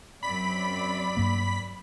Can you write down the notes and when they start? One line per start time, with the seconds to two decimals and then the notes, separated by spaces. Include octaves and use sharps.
0.23 F#2 C4 D5 B5 B6
1.17 G2 A#3